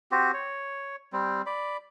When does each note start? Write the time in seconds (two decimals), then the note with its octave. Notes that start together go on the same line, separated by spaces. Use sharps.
0.12 C4 F#4 G4
0.34 C#5
1.13 G3 C4
1.46 D5 B5